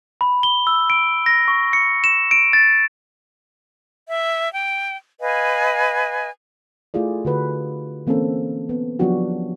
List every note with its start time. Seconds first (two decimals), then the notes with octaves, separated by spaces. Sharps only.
0.21 B5
0.43 G7
0.67 E6
0.90 D7
1.26 A#6
1.48 C#6
1.73 C#7
2.04 E7
2.31 D7
2.53 A6
4.07 E5
4.53 G5
5.21 B4 D#5 F5 G#5
6.94 A3 E4 F4 G#4 D5
7.25 D3 F#4 B4
8.07 E3 A#3 C4 C#4 A4
8.69 B3
8.99 F3 F#3 B3 D4 F#4 G4